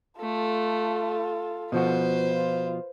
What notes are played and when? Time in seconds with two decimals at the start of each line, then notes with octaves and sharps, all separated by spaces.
0.20 A3 F4 A4
1.72 B2 F3 F#4 B4 C5
2.32 F4